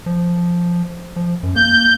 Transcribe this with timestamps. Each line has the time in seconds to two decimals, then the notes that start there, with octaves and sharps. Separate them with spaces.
0.06 F3
1.16 F3
1.43 F#2
1.56 A#3 G6